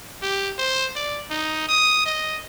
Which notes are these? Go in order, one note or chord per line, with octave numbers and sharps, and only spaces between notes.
G4
C5
D5
D#4
D#6
D#5